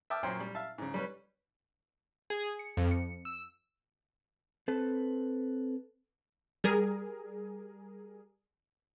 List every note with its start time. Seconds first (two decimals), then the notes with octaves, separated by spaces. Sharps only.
0.10 E5 G5 A5 D6 D#6 F6
0.23 F#2 A#2 C#4 C5 G5
0.40 G3
0.55 E5 F5 A5
0.78 G#2 C#3
0.94 G3 C#4 B4
2.30 G#4
2.59 C#7
2.77 F2
2.91 C#7
3.25 E6
4.68 C4 A4 B4
6.64 G3 G#4 A#4